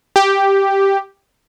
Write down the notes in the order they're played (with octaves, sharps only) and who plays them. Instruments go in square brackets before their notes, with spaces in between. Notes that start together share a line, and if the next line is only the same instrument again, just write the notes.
[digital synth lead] G4